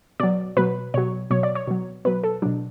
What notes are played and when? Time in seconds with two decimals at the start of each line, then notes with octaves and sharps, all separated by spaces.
0.20 B2 F#3 D5
0.57 B2 F#3 B4
0.94 B2 F#3 C#5
1.31 B2 F#3 C#5
1.43 D5
1.55 C#5
1.67 B2 F#3
2.05 B2 F#3 B4
2.24 A4
2.42 B2 F#3 D4